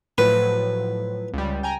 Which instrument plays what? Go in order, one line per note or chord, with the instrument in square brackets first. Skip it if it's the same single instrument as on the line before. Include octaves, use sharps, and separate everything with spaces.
[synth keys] A2 F3 F#3 [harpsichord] B4
[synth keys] C#2 G3
G5 G#5 A#5